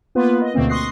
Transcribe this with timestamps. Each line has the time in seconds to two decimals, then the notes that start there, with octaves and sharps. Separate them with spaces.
0.15 A#3 B3 F4 B4
0.42 D#5
0.54 D2 B2 D3 A3 A#3 C4
0.69 C6 C#6 D#6 F#6 A#6 C7